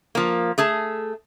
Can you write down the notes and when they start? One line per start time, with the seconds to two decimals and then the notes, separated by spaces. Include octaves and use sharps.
0.15 F3 A#3
0.58 A3 G#4 A5